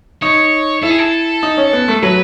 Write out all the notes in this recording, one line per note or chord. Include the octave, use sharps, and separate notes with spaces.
D#4 C#5
E4 A4
G#4
A4
D#4
C#4
B3
A3
F#3 B4